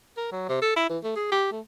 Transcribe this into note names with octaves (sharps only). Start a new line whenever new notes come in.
A#4
F#3
C3
A4
E4
E3
A3
G#4
G4
A3